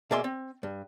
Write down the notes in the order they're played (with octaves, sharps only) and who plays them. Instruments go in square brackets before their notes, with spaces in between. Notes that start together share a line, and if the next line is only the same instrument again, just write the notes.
[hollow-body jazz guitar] B2 A#3 G#4 D5 E5 C6
C4
G2